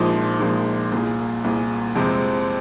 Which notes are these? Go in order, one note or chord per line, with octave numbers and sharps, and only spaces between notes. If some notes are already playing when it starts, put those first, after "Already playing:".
Already playing: A#1 A#2 F3 G#3 D#4
A#1 A#2 F3 G#3 D#4
C2 A#2 A#3 G#4
C2 A#2 A#3 G#4
F2 C3 F3 G#3 C4